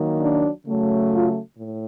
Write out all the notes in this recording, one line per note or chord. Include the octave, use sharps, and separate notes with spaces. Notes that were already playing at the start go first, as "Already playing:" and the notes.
Already playing: D#3 F#3 A#3
D4
C#3 F#3 A3
F4
A2